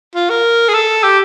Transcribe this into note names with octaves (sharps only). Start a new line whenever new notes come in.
F4
A#4
G#4
A4
G4